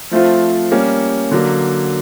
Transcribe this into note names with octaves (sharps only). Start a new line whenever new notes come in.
F3 A3 C4 F4
G3 A#3 C#4
D3 F#3 A#3